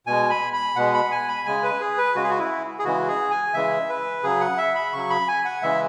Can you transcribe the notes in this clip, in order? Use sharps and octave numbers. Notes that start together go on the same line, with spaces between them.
B2 G#3 G#5
B5
B5
B2 G#3 F#5
B5
G#5
B5
C#3 G#3 G#5
B4
G#4
B4
C#3 G#3 F#4
G#4
F#4
E4
G#4
C#3 E3 G#3 F#4
G#4
G#5
C#3 E3 G#3 E5
B4
C#3 F#3 G#4
F#5
E5
B5
C#3 F#3 C#6
B5
G#5
F#5
C#3 E3 G#3 E5